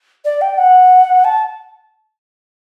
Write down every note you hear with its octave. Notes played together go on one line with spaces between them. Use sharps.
D5
G5
F#5
A5